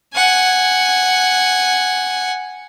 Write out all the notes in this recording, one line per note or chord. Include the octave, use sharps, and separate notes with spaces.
F#5 G#5